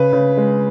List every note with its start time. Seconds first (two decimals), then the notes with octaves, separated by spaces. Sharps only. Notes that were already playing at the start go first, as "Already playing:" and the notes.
Already playing: C#3 B4
0.13 C#3
0.37 G#3